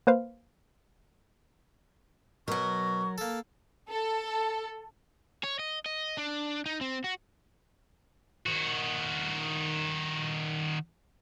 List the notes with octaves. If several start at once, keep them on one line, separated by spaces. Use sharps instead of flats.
A#3 B4 C5 F5
B2 F#3 A#4 C#6
A#3 A4
A4
C#5
D#5
D#5
D4
D#4
C4
F#4
D#3 F#4